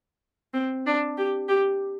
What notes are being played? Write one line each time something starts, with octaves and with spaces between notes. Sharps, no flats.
C4
D4
G4
G4